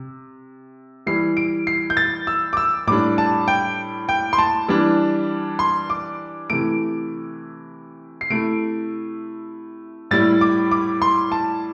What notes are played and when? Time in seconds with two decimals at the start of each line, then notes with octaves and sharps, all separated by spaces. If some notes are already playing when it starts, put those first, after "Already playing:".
Already playing: C3
1.06 E3 G3 E4 C7
1.37 D7
1.67 C7
1.90 G6
1.97 A6
2.27 E6
2.53 D6
2.57 E6
2.87 A2 G3 D4 D6
3.18 A5
3.48 G5
4.09 G5
4.33 C6
4.38 A5
4.68 E3 G3 D4
5.59 C6
5.90 D6
6.50 C3 E3 A3 D7
8.21 C7
8.30 C3 A3 E4 D7
10.11 A2 G3 E4 A6
10.41 D6
10.71 D6
11.02 C6
11.32 A5